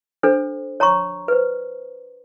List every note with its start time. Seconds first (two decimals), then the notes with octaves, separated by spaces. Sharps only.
0.23 D4 A4 C5
0.80 C#5 A#5 C6 C#6
1.28 B4 C5